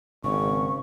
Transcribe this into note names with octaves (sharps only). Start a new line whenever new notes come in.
G#1 C#3 C#6